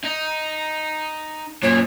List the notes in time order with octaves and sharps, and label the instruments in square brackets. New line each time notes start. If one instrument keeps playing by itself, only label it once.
[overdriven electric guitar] D#4
[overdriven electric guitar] F#2 A#2 [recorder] C#5